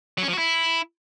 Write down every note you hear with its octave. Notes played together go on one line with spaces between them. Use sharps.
F#3
C#4
F3
F#4
E4